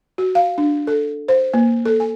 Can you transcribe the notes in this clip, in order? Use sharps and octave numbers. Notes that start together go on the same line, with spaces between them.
F#4
F5
D4
A4
C5
A#3
A4
G#5